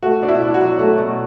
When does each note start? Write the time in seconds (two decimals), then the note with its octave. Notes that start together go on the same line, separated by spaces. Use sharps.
0.03 A3 F#4
0.22 B2 D4
0.28 E4
0.42 D4
0.54 F#4
0.61 F#3
0.79 A3
0.98 B2